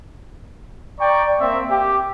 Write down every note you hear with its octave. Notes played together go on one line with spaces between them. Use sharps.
D5 G5 A#5 C#6
A#3 C4 E5
G4